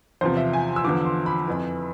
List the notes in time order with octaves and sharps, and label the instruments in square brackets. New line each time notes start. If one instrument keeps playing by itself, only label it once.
[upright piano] E2 C3 F3 C5
E5
G#5
E6
E2 D3 F3 D6
C6
B5
F2 E3